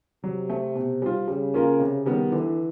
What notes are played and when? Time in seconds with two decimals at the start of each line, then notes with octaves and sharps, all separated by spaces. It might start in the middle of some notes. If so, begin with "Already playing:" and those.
0.24 C3 F#3
0.50 A3 C4
0.76 B2
1.02 G3 C4 F4
1.27 C#3 G3
1.54 A#3 C#4 F4 A#4
1.79 C3
2.06 D#3 G3 B3
2.31 D3 E3